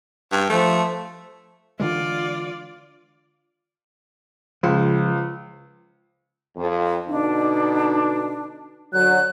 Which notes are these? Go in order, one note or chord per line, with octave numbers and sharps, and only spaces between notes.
G2
F3 A3
D3 E3 G#3 F4 D5
C#2 F3
F2
B2 D3 D4 D#4
D3 F#3 F#6